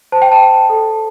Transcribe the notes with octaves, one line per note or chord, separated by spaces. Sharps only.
C5 A5
G5
A5
C5
A4